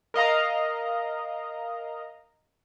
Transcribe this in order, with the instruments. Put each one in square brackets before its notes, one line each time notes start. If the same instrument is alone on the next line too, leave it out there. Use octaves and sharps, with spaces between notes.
[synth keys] A#4 D#5 F5 A#5